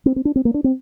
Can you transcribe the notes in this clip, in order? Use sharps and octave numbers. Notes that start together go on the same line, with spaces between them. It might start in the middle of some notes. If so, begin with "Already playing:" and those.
C4
C4
D4
C4
A#3
D4
C4